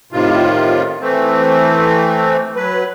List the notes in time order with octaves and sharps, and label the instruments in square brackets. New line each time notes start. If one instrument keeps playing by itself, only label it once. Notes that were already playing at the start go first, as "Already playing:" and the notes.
[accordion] A2 C3 D#3 F4
E3 A3 C4
F#3 B4